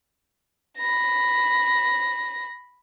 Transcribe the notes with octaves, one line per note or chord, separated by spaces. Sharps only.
B5 A#6